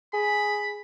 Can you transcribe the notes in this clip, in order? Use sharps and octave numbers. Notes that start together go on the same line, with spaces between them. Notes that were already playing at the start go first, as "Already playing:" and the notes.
G#4 B5